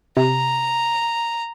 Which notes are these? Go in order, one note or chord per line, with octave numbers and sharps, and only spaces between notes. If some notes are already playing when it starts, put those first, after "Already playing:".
C3 A#5